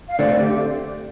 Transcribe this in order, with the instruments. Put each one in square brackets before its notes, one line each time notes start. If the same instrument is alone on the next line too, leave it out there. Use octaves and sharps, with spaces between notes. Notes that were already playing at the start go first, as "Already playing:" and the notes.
[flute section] F5
[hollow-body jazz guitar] D3 A3 C4 [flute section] D5
[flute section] G4